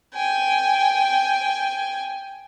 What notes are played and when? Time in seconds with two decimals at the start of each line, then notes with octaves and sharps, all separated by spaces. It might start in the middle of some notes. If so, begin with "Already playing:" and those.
0.14 G5 G#5